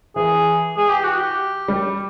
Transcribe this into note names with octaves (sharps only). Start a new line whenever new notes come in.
E3 G#4
G#4
G4
F#4
G4
G3